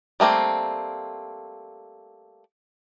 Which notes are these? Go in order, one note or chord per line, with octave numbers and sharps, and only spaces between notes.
G3 A3 A#3 C4